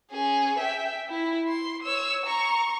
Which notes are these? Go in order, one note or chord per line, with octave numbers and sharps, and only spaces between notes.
C#4 G#4
E5 G5
E4
C6
C#5 E6
A#5 C#6